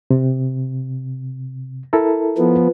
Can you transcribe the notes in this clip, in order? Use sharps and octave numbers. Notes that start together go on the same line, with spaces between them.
C3
E4 A4 A#4
F3 B3